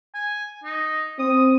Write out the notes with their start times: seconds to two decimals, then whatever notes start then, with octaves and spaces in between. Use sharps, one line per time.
0.15 G#5
0.64 D#4
1.19 C4 D#6